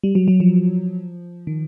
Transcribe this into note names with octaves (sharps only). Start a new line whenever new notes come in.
G3
F#3
F#3
F3
D#3